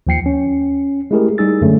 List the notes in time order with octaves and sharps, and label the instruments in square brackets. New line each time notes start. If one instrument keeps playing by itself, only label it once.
[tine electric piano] D#2 F3 G5 C7 C#7
C#4
G#3 A3 E4 G4 G#4 A#4
G3 G#3 D#4 G#4 E6 A6
F#2 D3 A3 C#4